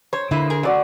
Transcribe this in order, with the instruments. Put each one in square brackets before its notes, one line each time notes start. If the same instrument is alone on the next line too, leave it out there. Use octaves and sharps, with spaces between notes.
[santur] C5 [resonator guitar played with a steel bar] C#5
[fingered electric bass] D3 [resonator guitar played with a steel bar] A#3 E4 B4
[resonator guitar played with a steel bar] G#4 A#4
[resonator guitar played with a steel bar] F#2 [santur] F#4 D5 F#5